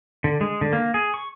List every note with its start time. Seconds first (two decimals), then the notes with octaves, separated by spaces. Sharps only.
0.24 D3
0.41 G#3
0.61 D3
0.73 A#3
0.94 G#4
1.14 C#6